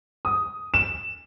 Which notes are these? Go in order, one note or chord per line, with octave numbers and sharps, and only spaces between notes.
D#6
E7